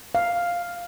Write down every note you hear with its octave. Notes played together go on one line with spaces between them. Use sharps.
F5